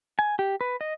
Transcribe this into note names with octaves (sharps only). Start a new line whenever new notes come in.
G#5
G4
B4
D#5